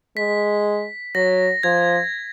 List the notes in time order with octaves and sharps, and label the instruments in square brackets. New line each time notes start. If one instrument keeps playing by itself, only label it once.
[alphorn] G#3 [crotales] B6
[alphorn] F#3 [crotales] A#6
[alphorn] F3 [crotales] G#6